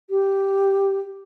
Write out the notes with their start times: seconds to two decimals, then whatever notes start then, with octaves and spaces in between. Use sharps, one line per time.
0.10 G4